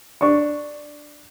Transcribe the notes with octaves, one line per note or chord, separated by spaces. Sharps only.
D4 C#6